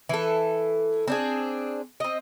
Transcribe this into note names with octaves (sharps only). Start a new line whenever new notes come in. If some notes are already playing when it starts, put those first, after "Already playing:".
E3 A4
C4 D4 G#4
C4 D#5